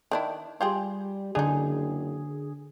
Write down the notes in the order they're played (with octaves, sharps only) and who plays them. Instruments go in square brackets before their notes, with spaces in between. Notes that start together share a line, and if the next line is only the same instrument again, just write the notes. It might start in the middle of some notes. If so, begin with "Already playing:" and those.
[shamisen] D#3 D4 E4
[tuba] G3 [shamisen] F4 G4 G#4
[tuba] F#1 [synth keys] D3 G#4 [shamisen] D4 D#4